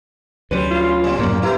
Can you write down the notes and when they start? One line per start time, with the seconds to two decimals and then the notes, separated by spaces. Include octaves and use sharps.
0.51 D2 F#3 G3 C#4 B4 C6
0.71 F4
1.04 A#2 G3
1.19 F#2 A2 A#3
1.42 B3 E4 G4 A#5